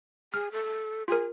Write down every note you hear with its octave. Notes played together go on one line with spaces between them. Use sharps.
G#4 F6
A4
F4 G#4 A#4